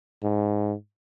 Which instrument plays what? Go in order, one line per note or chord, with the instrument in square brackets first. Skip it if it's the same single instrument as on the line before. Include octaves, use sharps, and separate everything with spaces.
[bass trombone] G#2